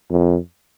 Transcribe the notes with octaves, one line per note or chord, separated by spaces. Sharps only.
F2